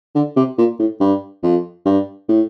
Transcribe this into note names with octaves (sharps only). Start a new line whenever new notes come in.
D3
C3
A#2
A2
G2
F2
G2
A2